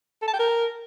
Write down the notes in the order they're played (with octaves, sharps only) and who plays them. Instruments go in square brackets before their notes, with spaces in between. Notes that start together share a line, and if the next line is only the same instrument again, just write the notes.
[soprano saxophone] A4
A5
G5
A#4